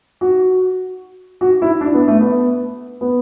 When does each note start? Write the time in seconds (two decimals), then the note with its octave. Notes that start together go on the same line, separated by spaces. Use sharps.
0.21 F#4
1.41 F#4
1.62 E4
1.81 D4
1.94 B3
2.08 A3
2.21 B3
3.01 B3